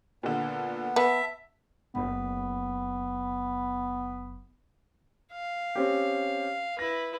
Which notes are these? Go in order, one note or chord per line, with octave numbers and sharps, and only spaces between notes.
A#2 D3 B3
B3 E5 A5
F#1 B3
F5
C4 C#4 G4
E4 B4 A#6